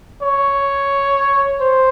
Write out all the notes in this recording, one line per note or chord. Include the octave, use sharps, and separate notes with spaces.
C#5
C5